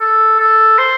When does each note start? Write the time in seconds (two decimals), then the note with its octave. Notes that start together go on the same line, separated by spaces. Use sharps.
0.01 A4
0.40 A4
0.78 C5